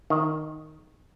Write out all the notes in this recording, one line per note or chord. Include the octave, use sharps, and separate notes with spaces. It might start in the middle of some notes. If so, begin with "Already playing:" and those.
D#3